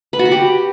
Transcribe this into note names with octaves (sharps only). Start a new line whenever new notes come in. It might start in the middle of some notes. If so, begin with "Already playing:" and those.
B4
F#4
F#5
G4